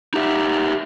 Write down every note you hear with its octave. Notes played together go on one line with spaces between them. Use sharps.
D#4 G4 E5